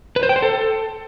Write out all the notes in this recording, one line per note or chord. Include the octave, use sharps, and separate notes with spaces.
B4
C5
G5
C5
A4